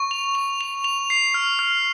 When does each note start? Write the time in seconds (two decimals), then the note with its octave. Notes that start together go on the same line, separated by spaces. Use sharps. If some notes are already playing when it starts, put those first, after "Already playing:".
Already playing: C#6
0.11 F7
0.35 F7
0.61 F7
0.84 F7
1.10 C7
1.34 F6
1.59 F6